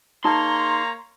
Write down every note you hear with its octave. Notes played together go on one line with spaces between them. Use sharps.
A#3 D#4 G#4 C#5 A5 A#5 C6